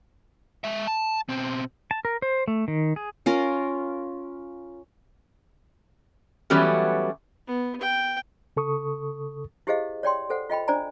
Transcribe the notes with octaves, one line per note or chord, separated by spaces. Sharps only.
G#3 E5
A5
B2 C4
A5
A#4
C5
A3
D#3
G#4
C#4 F4 A#4
E3 F#3 G3 A3 B3 C#4
B3
G5
C#3 A4 C#6 D#6
E4 G4 G#4 C5 D#5 F5
C#5 D5 G5 C6
A4 C5 F#5
F4 D#5 G5 B5
D4 C5 D5 G#5 A#5